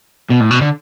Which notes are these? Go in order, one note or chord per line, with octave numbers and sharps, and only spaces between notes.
B2
A2
B2
D3